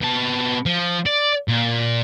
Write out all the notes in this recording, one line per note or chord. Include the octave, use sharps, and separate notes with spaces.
B2 A5
F3
D5
A#2